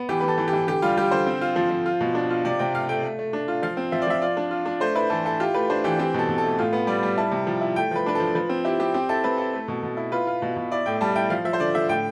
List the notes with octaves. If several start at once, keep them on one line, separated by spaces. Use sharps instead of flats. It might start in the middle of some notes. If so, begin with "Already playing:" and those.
Already playing: B3
E3 G4
B4
E3
A4
E3
G4
E3
D3 G4
G3 F4
G3 G4
D3 C5
C4
F4
F3
F3
F4
B2
D4
F4
C3 D5
C3 G5
A3 F5
A3 G5
A3
A3
D4
F4
F3 F5
C4
F3 E5
D5
F3 E5
F4 D5
D4
F4
D4
A3 C5
E4 B4
E3 A4
E4 A4
F4 G4
A3 B4
D4 C5
E3 G4
C4 G4
B2 A4
B2
A4
A3
A2 F4
B3
G3 D5
G3
E4 A5
C3
F3
E4
A3 G5
F3 B4
D4 B4
F3 A4
F3 B4
C4
E4 G4
C4 G4
C4 G4
E4 A4
C4 B4
E4 A4
A3
B2
B2
E4
F4 B4
F4
B2
B2
E4 D5
A2 G5
G3 A5
E4 G5
F3 F5
F3 E5
C5
D3 D5
D3 E5
A2 G5